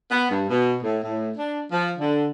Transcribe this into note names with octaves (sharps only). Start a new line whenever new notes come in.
B3
G2
B2
A2
A2
D4
F3
D3